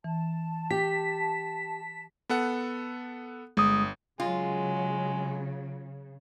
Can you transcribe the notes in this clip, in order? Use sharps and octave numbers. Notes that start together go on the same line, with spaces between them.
E3 A5
G4 B6
B3 A4 F#5
G1 G#3 D#6
C#3 F#3 G#3 F4